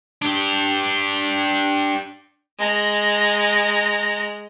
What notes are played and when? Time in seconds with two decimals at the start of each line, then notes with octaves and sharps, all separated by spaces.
0.22 D4 G4
2.59 G#3 A#5